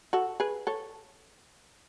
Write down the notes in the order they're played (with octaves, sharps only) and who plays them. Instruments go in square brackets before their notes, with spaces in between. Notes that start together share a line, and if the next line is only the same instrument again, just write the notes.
[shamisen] F#4 A4
G#4 B4
A4 C#5